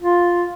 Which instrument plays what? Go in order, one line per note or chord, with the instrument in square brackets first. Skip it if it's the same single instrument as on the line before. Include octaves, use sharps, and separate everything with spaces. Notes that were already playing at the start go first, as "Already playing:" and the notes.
[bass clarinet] F4